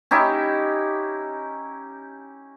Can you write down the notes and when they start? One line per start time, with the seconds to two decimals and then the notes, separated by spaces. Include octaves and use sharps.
0.11 C#4 D#4 E4 G4